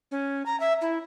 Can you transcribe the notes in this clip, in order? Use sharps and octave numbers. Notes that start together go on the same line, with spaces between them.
C#4
A#5
E5
E4